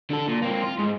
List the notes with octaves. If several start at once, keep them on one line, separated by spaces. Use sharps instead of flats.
D3 A4
A#2
A#3 C4
F4
G#2